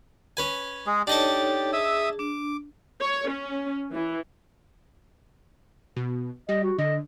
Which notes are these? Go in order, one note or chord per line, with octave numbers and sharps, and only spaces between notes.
C#4 B4 G#5
G#3 G#4
D4 D#4 G4 A4 C#5 D#5 A5
G#4 E5 D#6 E6
D4 D6
C#5
C#4
E3
B2
G3 D#5
F#4
D3 D#5